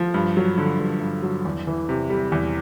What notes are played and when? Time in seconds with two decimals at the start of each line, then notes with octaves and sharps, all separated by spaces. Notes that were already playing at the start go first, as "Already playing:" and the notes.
Already playing: F3
0.14 G2
0.37 F#3
0.58 D3
0.79 G2
1.01 G2
1.23 F#3
1.45 E2
1.67 E3
1.89 C3
2.10 G3
2.32 E2